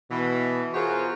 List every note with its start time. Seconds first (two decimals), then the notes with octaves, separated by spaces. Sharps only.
0.11 B2 E3
0.74 F4 F#4 G#4 A#4 C5 C#5